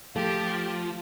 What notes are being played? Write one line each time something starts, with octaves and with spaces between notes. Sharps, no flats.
F3 A3 F4 G4